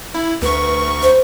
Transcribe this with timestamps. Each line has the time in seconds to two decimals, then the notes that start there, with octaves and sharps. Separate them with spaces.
0.15 E4
0.42 D2 B4 C#6
1.03 C5